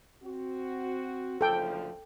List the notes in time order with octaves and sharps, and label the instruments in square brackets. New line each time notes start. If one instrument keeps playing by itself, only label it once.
[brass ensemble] C4 F#4
[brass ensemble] F#1 D2 F3 [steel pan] A4 G5